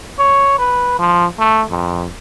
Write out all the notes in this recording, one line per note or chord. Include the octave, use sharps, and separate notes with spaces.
C#5
B4
F3
A3
F2